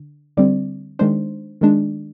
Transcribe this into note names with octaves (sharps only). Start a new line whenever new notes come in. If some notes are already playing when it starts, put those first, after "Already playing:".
Already playing: D3
D3 G3 C4 D5
D#3 G#3 D4 C5
D#3 G#3 D4